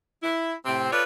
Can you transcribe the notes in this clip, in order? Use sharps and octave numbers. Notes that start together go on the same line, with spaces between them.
E4
A2 C3 C4
F4 A4 B4 C#5 D5